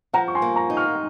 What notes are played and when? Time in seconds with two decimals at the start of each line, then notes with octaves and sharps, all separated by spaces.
0.13 F3 F#5 A#5
0.28 C#6
0.35 G#5 C6
0.42 A#3
0.56 A#5 C#6
0.70 D#4
0.77 C#6 F6